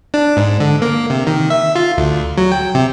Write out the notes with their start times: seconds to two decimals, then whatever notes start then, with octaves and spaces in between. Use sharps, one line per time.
0.14 D4
0.37 G#2
0.60 D3
0.82 A#3
1.10 C3
1.27 D#3
1.50 E5
1.76 F4
1.98 D2
2.38 F#3
2.52 G5
2.75 C3